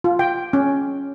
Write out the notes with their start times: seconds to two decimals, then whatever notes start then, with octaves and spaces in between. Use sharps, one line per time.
0.04 F4
0.19 G5
0.53 C#4